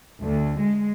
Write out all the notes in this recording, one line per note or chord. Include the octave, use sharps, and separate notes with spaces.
D2
G#3